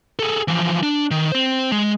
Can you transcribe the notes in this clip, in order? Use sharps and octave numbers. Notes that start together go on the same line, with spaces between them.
G#4 A4
E3 F3
D4
D#3
C4 C5
G#3